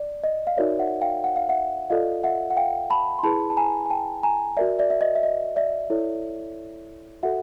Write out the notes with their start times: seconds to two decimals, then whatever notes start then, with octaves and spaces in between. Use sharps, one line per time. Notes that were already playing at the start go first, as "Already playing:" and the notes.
Already playing: D5
0.24 D#5
0.47 F5
0.57 D#4 F#4 A#4 C#5 D5 E5
0.79 E5 F#5
1.02 F5 G5
1.24 F#5
1.36 F5
1.49 E5 F#5
1.90 F4 A4 D5 D#5 F5
2.24 E5 F#5
2.51 F#5
2.57 F5 G5
2.90 A5 B5
3.19 C6
3.23 E4 G#4 B4 A5 B5
3.50 A5
3.57 G#5 A#5
3.86 G#5
3.90 G5 A5
4.23 G#5 A#5
4.57 F#4 A#4 D5 E5
4.79 D5 E5
4.90 E5
5.01 D#5
5.15 E5
5.23 D#5
5.56 D5 E5
5.90 E4 A4 C#5
7.23 F#4 A4 E5 F#5